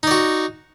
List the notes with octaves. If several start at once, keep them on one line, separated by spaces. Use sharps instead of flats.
D#4 F#4 D5